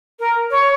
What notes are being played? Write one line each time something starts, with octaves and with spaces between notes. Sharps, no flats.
A#4
C#5